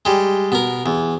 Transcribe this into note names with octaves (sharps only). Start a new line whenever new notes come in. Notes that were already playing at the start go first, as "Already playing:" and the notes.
G3 G#3
B2 A#4
E2